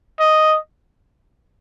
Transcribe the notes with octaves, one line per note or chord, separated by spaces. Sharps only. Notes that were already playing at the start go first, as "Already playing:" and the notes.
D#5